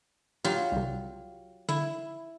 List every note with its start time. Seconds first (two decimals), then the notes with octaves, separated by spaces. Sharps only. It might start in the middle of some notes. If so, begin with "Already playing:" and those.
0.44 F#3 F4 G4
0.72 C2 C3
1.69 D3 E4